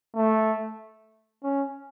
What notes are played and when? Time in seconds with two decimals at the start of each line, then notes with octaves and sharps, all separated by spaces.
0.16 A3
1.44 C#4